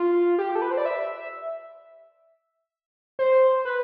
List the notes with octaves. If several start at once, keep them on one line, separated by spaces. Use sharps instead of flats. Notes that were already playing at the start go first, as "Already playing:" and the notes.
Already playing: F4
G4
A4
B4
C5
D5
E5
C5
B4